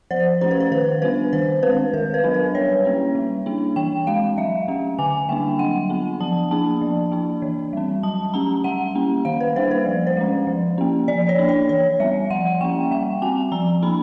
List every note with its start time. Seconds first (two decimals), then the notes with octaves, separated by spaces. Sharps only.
0.11 F3 C5
0.41 A3 C#4 C5
0.51 B4
0.60 C5
0.71 D#3 B4
1.02 G3 B3 D4 B4
1.32 D#3 C5
1.63 G#3 C4 B4
1.93 D#3 A#4
2.14 B4
2.24 F#3 B3 D4
2.34 B4
2.55 G3 C#5
2.85 A#3 C#4
3.15 G3
3.46 A#3 D4
3.76 E3 G5
4.07 G#3 C4 F5
4.37 F#3 E5
4.68 A3 C#4
4.99 D3 G#5
5.29 G3 A#3 D4 G5
5.59 F#3 F#5
5.90 B3 D4
6.20 F3 A5
6.51 A#3 D4 A5
6.82 F3
7.12 A#3 D4
7.42 E3
7.73 G3 C4
8.03 F#3 A5
8.34 A3 C#4 A#5
8.64 G3 F#5
8.95 A#3 C#4
9.25 D#3 F5
9.41 B4
9.56 G3 A#3 D4 C5
9.71 B4
9.86 F3
10.07 C5
10.17 G#3 C#4
10.47 F3
10.78 A#3 C#4
11.08 F3 D5
11.29 C#5
11.39 A#3 D4
11.49 C#5
11.69 E3 C#5
12.00 G3 B3 E5
12.30 F3 F#5
12.60 A#3 C#4 G5
12.91 G3 G5
13.22 C4 G#5
13.52 F3 A#5
13.82 A#3 D4 B5